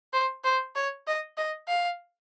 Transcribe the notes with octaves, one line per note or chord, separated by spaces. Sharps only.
C5
C5
C#5
D#5
D#5
F5